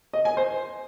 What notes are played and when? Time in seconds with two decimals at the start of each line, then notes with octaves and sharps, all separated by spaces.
0.13 D#5
0.25 G#5
0.37 C5